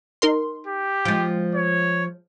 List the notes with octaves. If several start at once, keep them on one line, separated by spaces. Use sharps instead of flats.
D#4 A#4 C6
G4
F3 G#3 G5
C#5